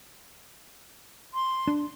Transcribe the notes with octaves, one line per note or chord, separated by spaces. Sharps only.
C6
D4